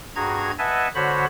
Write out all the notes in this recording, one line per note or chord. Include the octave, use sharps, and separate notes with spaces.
G2 F#4 G#4 A#5 G#6
B4 D#5 E5 F#5 G#5 A5
D3 F#4 C5 C#5 B5